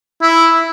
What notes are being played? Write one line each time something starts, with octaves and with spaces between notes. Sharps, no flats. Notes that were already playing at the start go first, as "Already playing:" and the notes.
E4